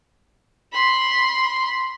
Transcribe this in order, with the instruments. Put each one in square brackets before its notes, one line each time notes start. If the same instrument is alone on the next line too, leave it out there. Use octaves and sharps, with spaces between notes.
[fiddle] B5 C6